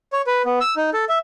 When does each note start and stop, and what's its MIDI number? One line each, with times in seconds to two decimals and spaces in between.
0.13 0.22 73
0.27 0.42 71
0.45 0.59 59
0.61 0.75 88
0.76 0.90 63
0.93 1.05 69
1.09 1.18 76